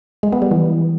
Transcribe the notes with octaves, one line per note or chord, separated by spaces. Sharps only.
G#3
B3
G3
E3